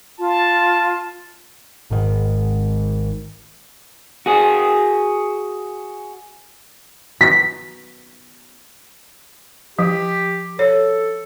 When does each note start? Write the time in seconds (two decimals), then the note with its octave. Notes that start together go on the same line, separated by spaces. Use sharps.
0.19 F4 A5
1.90 G#1 G#2 D#3
4.26 F#4 G#4
7.21 B6
9.79 F3 G4
10.59 A4 C#5